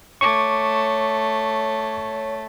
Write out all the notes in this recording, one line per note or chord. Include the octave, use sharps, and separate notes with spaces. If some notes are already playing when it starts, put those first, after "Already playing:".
A3 C#5 C#6 D6